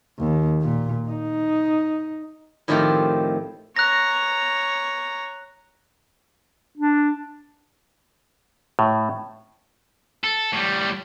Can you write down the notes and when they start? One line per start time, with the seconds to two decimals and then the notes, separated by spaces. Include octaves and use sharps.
0.19 D#2
0.62 A#2
1.09 D#4
2.68 A2 D#3 F3 A3 C4 G4
3.76 C#5 A#5 F#6 A#6
6.77 D4
8.79 A2
10.24 A4
10.53 A2 G3